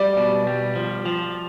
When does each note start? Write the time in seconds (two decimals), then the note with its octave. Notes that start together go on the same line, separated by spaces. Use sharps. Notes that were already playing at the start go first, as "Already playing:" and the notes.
Already playing: G3 D5
0.17 B2
0.47 G3
0.75 F3
1.06 F3